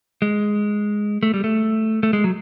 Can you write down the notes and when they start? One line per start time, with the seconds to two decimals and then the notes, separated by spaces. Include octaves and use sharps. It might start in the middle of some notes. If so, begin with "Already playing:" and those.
0.22 G#3
1.23 A3
1.34 G3
1.44 A3
2.03 A3
2.13 G#3
2.24 F#3